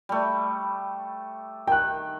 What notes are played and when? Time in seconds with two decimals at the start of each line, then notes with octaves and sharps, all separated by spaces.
0.09 G3 A3
1.67 D#3 G5 F#6